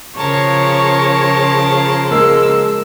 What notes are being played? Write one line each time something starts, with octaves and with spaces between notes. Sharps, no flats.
C#3 F3 A#4 C#5 A5 C6
G#3 A#3 E6